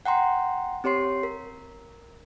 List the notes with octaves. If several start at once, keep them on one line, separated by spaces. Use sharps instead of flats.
F#5 G5 A#5 C6
C4 G4 C#5 C6 C7
A#4